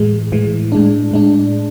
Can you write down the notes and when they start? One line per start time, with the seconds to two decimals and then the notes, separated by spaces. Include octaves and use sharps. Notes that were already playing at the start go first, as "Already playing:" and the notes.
Already playing: A2 E3 G#3
0.32 A2 E3 G#3
0.72 A2 G#3 D4
1.11 A2 G#3 D4